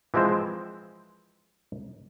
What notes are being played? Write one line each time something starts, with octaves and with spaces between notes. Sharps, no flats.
E3 F3 G#3 C4 C5